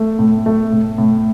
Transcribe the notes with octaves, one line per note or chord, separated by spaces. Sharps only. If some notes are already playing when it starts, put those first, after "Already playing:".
Already playing: A3
A2
A3
A2
A2